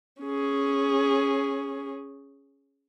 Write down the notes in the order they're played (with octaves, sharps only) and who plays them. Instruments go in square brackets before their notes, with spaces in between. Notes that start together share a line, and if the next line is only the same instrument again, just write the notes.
[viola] C#4 G#4